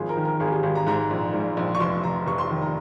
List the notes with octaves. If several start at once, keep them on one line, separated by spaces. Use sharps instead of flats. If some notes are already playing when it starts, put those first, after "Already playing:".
Already playing: G#1 F3 G#4
A#4
D#3
A#4
G#1 G#4
G4
G#1
A#5
G#2 A#5
A#1
G#2
A#1
C#6
F1 C6
F1 A#5
F1 C#6
C6
D#3
A#5